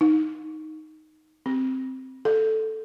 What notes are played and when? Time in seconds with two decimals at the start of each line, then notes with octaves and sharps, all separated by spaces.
0.01 D#4
1.46 C4
2.25 A4